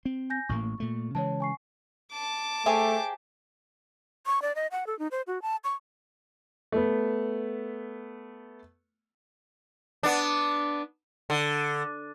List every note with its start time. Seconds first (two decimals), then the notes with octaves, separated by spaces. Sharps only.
0.05 C4
0.30 G#5 G6 A#6
0.49 A1 A2 A#3 C#6
0.80 A#2 A3
1.15 C#3 E3 G#3 C#5 A5
1.40 G#5 C#6 C7
2.12 A5 D6
2.66 A3 G4 G#4 C5 E5
4.26 C#6
4.42 D5
4.55 D#5
4.71 F#5
4.87 A4
4.99 D#4
5.11 C5
5.27 F#4
5.42 A5
5.64 C#6
6.72 A3 B3
10.03 B3 D4
11.30 D3